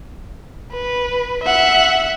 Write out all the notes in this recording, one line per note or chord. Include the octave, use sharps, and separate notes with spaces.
B4
E5 F#5